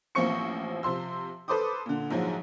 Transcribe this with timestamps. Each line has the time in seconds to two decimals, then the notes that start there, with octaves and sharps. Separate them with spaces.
0.15 A1 F3 A#3 C4 C#6 C#7
0.83 C3 F3 C6 E6
1.48 A4 B4 C5 C6 D6 D#6
1.86 A#2 D3
2.10 A#1 G#2 F3 F#3 G#3